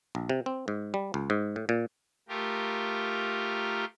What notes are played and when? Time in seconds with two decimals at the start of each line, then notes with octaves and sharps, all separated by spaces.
0.15 A#1
0.29 C3
0.46 C4
0.68 G#2
0.94 G3
1.14 C#2
1.30 G#2
1.56 A2
1.69 A#2
2.29 A3 F4 G4 A#4